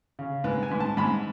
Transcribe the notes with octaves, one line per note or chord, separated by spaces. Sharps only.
C#3
G#2 B4
G#5
G#2
A5
G#2 B5